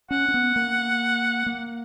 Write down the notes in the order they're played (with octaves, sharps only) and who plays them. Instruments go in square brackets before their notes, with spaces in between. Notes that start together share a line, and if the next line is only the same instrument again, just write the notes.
[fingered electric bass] C#4 [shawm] F#5
[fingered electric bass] C#4
B3
A#3
A#3